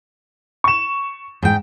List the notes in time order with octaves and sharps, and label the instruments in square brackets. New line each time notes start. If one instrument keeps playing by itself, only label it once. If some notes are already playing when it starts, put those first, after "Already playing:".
[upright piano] C#6 E7
[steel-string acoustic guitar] G#2 G5